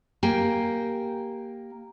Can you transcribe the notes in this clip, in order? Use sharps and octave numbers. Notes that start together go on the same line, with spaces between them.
A#3 G4 G5 G#5